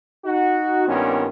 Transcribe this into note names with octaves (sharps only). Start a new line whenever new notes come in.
D#4 F#4
G2 A#2 D#3 B3 C#4